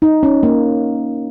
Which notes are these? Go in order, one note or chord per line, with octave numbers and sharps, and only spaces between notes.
D#4
C#4
A#3